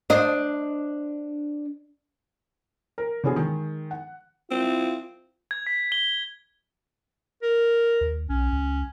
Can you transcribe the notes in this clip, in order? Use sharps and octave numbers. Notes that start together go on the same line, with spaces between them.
D4 C5 D#5
A#4
D3 B3 C#4 F#4 G#4
D#3 G#3
F#5
C4 E4 F4
G#6
B6
G7
A#4
D#2
B1 C#4
C#2